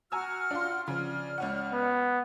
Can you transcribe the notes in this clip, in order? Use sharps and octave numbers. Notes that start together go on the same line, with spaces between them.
F#4 F#5 G#5 A#5 E6 F6
D4 F4 C6
C#3 F3 D5 F6
C#2 C#4 F#5
B3